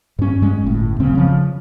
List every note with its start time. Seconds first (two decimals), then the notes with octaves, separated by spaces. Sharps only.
0.19 G2 C#4
0.42 G2 G#3 C#4
0.63 G1 A2
1.00 D#1 F#2 C#3 C4
1.15 C#3 F3